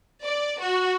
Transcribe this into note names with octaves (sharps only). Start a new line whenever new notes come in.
D5
F#4